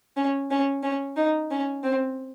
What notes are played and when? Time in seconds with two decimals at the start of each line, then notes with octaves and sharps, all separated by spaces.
0.17 C#4
0.51 C#4
0.83 C#4
1.16 D#4
1.51 C#4
1.83 C4